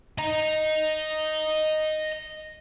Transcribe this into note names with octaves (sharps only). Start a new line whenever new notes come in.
D#5 A#5